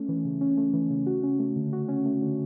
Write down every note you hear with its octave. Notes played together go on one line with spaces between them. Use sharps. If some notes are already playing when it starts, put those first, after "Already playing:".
Already playing: A3 C#4
E3
C#3
C#4
A3
E3
C#3
F#4
C#4
A3
D3
F#4
C#4
A3
D3